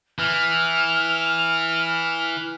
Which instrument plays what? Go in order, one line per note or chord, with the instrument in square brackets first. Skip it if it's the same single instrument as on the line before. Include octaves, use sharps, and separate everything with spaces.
[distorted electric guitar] E3 [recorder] F6